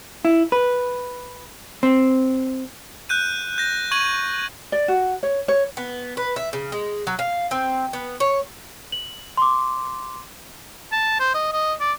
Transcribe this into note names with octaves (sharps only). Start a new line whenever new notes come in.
E4
B4
C4
F#6 G6 D#7
G6 A#6
C#6 G#6 D#7 F#7
D5
F#4
C#5
C#5
B3
B4
E5
C#3
G#3
F#3
F5
C4
B3
C#5
F#7
C6 D6
A5
C5
D#5
D#5
D5